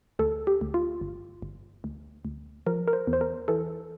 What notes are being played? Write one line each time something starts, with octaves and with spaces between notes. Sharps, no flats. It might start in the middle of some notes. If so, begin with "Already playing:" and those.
D2 A4
G4
D2
F4
G1
G1
D2
D2
F3 A#4
A#4
C5
E2
C5
A#4
E3 A4